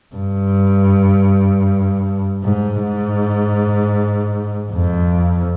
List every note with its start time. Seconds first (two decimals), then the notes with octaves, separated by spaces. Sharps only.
0.15 G2
2.43 G#2
2.82 G#2
4.72 F2